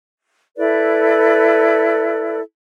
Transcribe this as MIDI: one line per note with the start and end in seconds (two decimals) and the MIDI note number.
0.57 2.39 64
0.57 2.39 69
0.57 2.39 71
0.57 2.39 74